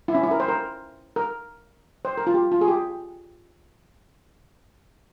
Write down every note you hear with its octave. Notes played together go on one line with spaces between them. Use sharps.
E4
C#4
E4
A#4
C5
A#4
A#4
C5
A#4
F4
G4
F4
G#4
G4